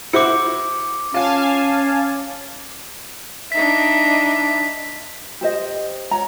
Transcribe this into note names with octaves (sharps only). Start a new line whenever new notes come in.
E4 F#4 C5 D6 C#7
C#4 F4 F5 G#5 A5
D4 D#4 E5 B6
G4 C5 D#5
C#5 A#5